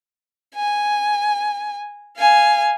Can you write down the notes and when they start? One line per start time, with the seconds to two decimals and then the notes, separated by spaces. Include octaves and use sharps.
0.56 G#5
2.17 F5 G#5